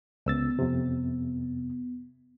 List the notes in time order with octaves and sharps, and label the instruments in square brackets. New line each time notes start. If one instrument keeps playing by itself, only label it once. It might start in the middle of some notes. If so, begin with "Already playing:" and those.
[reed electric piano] C#2 E6 A6 [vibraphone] B3
[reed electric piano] F2 C3